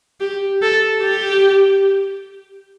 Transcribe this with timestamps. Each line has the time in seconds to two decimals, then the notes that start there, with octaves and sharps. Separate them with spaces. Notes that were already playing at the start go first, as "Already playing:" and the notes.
0.21 G4
0.62 A4
1.02 G4